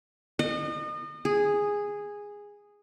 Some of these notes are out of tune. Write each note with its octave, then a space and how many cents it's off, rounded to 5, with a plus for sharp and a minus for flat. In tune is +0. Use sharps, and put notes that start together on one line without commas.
D#5 -35
G#4 -10